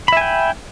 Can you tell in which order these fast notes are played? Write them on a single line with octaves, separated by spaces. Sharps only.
B5 E5 G#5 G5